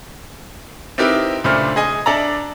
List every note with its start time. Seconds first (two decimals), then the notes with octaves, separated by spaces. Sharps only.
0.98 C4 D#4 E4 G4 A#4 B4
1.44 C#2 A#2 A3 D4 C5 F6
1.76 G#4 D#5 G#5
2.06 D4 A4 D5 E5 A#5